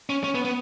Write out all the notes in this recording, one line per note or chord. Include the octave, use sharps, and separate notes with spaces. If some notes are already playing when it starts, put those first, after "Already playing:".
C#4
C#4
B3
B3